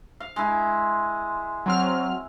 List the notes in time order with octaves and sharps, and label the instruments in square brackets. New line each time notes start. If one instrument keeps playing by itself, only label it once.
[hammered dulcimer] F5
G#3 E4
[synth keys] F#3 C4 F6